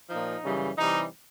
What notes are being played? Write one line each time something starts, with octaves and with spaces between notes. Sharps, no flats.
A#2 F3 D#4
F#2 C#3 E3 G3
C3 E3 G3 D#4